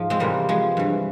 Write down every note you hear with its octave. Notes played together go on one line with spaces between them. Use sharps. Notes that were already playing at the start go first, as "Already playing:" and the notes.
Already playing: G#2 F3
G#3 C4
E2 C3 E3 G3 A#3
F3 G#3
G2 E3